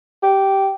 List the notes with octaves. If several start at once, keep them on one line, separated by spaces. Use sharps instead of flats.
G4